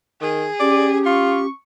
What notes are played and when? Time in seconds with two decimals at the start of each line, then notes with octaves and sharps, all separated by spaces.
0.21 D#3 G#4
0.60 C#4 G4 D5
1.05 F4 C#6